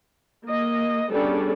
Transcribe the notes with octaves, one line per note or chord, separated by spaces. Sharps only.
A#3 D#5
G3 B3 C#4 D4 G#4 A4